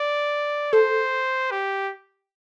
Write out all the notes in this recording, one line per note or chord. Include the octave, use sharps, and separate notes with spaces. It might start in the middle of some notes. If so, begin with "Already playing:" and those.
Already playing: D5
A4 C5
G4